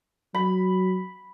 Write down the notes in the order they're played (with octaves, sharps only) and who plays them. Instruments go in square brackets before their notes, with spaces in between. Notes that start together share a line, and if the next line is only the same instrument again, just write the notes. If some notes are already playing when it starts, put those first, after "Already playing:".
[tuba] F#3 [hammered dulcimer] B5